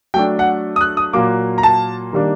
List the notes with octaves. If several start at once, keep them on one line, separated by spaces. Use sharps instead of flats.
F#3 A3 D4 G5
F#5
D#6
F#6
D#6
A#2 F#3 A#3 D6
A#5
A5
D#3 G3 A#3 D4